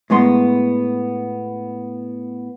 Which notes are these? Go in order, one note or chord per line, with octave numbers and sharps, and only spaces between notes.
A2 G#3 B3 C6